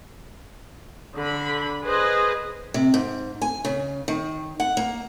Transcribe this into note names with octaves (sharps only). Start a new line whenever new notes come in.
D3 B5
G#4 B4 C5 D#5
C3
G#2
G#5
C#3
D#3
F#5
A#3